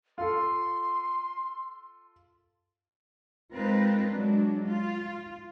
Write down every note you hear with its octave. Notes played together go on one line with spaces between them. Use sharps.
F4 A4 C6
G#3 C4 D#4 F4 A#4 B4
F#3 G#3 D4
F4